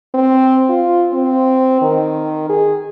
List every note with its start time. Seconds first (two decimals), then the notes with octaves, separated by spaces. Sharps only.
0.14 C4
0.69 F4
1.13 C4
1.82 D#3
2.49 G#4